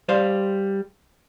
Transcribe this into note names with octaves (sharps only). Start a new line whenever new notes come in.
G3 C5 F5